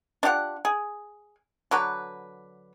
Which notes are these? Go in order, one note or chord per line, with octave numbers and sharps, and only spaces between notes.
D4 F4 G4 F#5
G#4
D3 F#3 B4